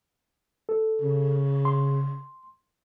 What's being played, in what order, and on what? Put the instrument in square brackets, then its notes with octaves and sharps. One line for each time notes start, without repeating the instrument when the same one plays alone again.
[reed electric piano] A4
[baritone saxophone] C#3
[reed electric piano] C6